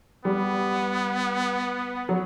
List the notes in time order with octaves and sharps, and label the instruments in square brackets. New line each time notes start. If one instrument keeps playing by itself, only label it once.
[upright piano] G3 [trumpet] B3
[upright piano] F#3